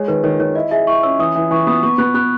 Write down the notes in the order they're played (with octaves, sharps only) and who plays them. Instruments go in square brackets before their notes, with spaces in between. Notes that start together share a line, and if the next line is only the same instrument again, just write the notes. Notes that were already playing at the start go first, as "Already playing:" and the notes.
Already playing: [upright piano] G#3 [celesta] C#5
[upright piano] D#3 [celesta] B4
[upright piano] D#3 [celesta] C#5
[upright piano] D#3 [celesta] C#5
[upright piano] E4 [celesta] D#5
[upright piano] G#4 [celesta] E5
[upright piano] E4 [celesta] C#6
[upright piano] C#4 [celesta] E6
[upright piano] E3 [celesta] D#6
[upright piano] E3
[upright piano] E3 [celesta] C#6
[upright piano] B3 [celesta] D#6
[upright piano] B3 [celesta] C#6
[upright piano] B3 [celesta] F#6
[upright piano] B3 [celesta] F#6